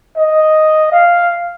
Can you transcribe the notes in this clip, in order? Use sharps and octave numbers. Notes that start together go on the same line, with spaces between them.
D#5
F5